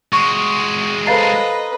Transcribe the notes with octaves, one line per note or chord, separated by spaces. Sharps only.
G#3 F#4 C#6
A4 B4 C5 D#5 F5 A#5 A6 C7